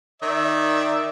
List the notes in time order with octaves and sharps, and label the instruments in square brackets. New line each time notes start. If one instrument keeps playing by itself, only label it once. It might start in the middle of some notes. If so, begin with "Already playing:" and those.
[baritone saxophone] D#3 [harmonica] D5 E5